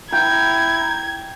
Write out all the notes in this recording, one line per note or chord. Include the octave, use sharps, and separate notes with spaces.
E4 G5 A#5 G#6